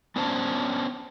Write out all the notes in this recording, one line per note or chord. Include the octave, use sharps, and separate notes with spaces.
B3 C#4 D4 C5 C#5 A5